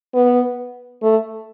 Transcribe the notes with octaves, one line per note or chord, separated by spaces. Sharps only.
B3
A3